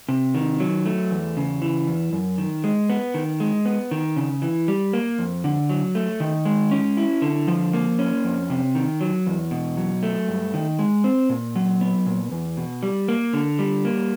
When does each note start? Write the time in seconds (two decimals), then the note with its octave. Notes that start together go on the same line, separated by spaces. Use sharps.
0.09 C3
0.35 D#3
0.60 F#3
0.86 A3
1.11 E2
1.37 C#3
1.62 E3
1.88 E2
2.13 F#2
2.38 D#3
2.64 G#3
2.90 B3
3.14 D#3
3.40 G#3
3.65 B3
3.91 D#3
4.16 C#3
4.42 E3
4.68 G3
4.93 A#3
5.19 F2
5.44 D3
5.69 F#3
5.95 A3
6.20 D#3
6.45 G#3
6.71 C#4
6.97 E4
7.22 D3
7.48 F3
7.73 A#3
7.99 C#4
8.24 F2
8.50 C3
8.75 D#3
9.01 F#3
9.27 E2
9.51 B2
9.77 F#3
10.03 A3
10.28 G2
10.54 D#3
10.79 G#3
11.04 C4
11.30 A#2
11.56 F#3
11.81 B3
12.06 A#2
12.32 E2
12.57 B2
12.83 G3
13.08 A#3
13.33 D3
13.59 G3
13.85 A#3